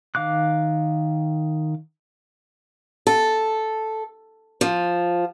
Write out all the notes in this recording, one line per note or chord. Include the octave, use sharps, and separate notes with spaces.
D#3 F5 D6 F#6
A4
F3